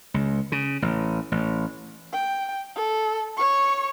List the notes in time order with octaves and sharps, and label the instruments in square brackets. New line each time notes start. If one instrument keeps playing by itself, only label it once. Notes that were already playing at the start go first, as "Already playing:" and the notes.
[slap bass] C#2
C#3
A1
A1
[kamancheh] G5
A4
C#5 C#6